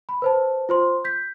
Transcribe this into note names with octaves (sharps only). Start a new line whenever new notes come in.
B5
B4 C5 A5
F4 C5 C6
G6 B6